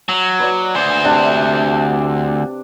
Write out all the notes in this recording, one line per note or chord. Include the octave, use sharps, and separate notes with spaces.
F#3
B4 D5
D2 C5
C3 D4